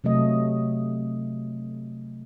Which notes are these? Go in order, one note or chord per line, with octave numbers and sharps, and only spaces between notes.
C3 F#3 A3 D#5